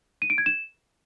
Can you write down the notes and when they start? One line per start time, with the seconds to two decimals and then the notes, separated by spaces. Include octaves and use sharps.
0.22 D#7
0.30 D7
0.38 G#6
0.46 E7